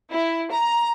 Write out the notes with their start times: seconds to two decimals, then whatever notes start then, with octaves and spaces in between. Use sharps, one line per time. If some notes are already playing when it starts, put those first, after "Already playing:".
0.10 E4
0.52 A#5